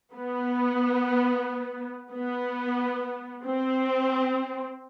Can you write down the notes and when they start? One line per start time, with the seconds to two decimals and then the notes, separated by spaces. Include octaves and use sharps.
0.13 B3
2.12 B3
3.45 C4